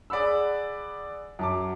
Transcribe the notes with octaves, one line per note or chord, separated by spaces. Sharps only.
G#4 D5 F#5 B5 E6
F#2 A5 D6